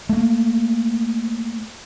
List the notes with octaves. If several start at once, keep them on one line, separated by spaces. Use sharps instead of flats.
A3 A#3